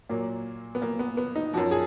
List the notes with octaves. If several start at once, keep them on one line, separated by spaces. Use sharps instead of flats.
A#2 F#3 A#3
B3
A#3
B3
B3
D#4
F#2 F3 F#4
G#4